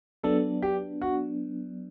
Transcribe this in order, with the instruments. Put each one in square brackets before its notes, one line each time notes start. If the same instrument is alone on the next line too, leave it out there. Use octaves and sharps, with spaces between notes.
[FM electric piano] F#3 B3 D4 [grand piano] A4
[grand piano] G4
F#4